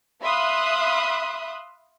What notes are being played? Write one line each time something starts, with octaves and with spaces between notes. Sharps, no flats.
E5 F5 B5 C6 D#6 F#6